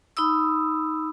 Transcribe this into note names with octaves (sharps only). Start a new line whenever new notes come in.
D#4 B5 D#6 E6